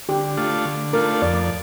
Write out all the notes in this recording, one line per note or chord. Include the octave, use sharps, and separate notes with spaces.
D3 G4
A3 D4 F4
D3
A3 D4 F4 A#4
F2 D5